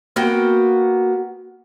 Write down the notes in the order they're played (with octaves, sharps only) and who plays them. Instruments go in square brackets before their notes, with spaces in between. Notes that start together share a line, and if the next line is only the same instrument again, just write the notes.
[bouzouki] A#3 B3 F#4 G5